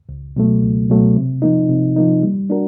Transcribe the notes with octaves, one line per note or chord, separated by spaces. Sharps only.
C#2
B2 F#3 A3
C#2
B2 F#3 A3
C3
F3 A#3 D#4
C3
F3 A#3 D#4
G3
A#3 D4 F#4 A#4